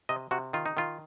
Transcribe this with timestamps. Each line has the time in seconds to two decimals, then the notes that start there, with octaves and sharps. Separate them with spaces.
0.09 C3 D#5
0.31 C3 F#4
0.53 D#3 F4
0.66 D#4
0.77 D#3 F4